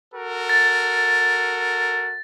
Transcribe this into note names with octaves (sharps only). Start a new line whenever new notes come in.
F#4 A4 A#4
A6